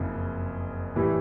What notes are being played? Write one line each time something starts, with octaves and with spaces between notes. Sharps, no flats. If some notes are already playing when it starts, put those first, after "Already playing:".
Already playing: F#1 F2 C#3
A2 E3 G3